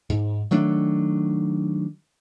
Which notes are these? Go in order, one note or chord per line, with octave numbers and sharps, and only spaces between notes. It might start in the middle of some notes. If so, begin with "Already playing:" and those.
G#2
D#3 F#3 A3 D4